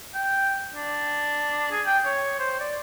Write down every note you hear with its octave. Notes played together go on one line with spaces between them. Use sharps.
G5
D4
G#4
G5
C#5
C5
D5